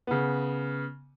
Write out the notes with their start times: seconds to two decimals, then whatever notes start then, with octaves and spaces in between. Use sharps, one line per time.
0.07 C#3 B3